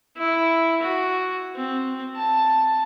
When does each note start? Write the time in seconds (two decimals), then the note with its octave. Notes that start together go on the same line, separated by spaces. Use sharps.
0.17 E4
0.82 F#4
1.56 C4
2.16 A5